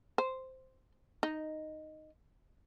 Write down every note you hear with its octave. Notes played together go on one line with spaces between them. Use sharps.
C5
D#4